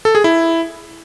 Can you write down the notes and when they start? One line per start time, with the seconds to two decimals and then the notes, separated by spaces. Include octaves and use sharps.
0.05 A4
0.15 G#4
0.24 E4